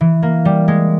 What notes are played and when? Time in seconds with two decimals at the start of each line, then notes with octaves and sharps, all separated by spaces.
0.01 E3
0.22 A#3
0.45 G3
0.68 G#3